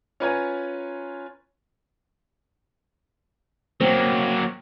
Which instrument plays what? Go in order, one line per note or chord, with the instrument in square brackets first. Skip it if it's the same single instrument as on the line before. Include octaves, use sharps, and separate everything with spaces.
[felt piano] C#4 F4 B4 C#5 G#5 A#5
[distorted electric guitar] F#3 A#3 [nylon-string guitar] C4